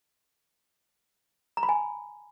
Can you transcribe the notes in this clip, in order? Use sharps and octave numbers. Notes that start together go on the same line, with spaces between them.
A#5
B5
G#5